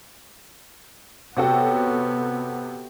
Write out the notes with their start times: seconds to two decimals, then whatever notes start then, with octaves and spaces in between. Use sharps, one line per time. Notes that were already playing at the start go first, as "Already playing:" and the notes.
1.37 C3 B3 F#4 G4 A4 C#5 G5